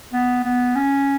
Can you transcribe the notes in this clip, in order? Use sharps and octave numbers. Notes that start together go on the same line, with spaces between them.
B3
B3
C#4